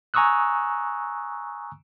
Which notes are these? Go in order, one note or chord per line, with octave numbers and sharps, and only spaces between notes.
G#5 A#5 C#6 D#6 E6 F#6